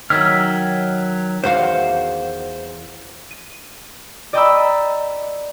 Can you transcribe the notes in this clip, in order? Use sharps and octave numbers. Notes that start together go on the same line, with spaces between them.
D#3 F#3 C#5 E5 F6
E2 F#4 C5 F5
D#7
D5 D#5 G5 A#5 B5 E6